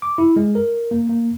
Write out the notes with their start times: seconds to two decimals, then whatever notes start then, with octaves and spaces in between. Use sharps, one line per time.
0.02 D6
0.18 E4
0.36 G#3
0.55 A#4
0.91 A#3
1.09 A#3